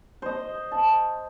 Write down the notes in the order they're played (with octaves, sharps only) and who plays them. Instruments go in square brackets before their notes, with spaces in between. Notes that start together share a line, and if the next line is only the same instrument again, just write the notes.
[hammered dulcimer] C5 D#5
A5